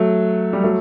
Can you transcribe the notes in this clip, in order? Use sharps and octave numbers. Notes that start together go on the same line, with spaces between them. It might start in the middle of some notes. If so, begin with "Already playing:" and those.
Already playing: F#3 A3
G3
F#3 A3